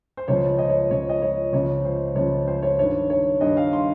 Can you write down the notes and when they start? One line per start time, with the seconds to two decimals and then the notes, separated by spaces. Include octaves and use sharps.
0.17 C5
0.28 C#2 C#3 F3 C#5
0.58 D#5
0.69 C#5
0.90 C#2 C#3 F3 C#5
1.09 D#5
1.22 C#5
1.53 C#2 C#3 F3 C#5
1.85 C5
2.15 C#2 C#3 F3 C#5
2.47 C5
2.62 C#5
2.78 G2 D#3 C#5
3.10 C#5
3.41 G2 D#3 D#5
3.57 F5
3.73 C6